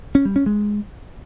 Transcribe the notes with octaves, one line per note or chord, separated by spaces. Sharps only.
C#4
G3
C#4
G#3